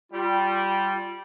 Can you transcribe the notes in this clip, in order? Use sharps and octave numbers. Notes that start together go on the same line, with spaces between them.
G3 F4